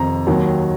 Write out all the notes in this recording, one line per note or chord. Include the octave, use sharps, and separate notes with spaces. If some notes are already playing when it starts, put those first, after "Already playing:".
Already playing: F2 C3 D#3 A#5
D#2 D#3 F#3